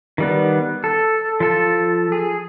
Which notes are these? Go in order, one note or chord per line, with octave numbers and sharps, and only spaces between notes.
D#3 G3 B3
A4
F3 A4
G#4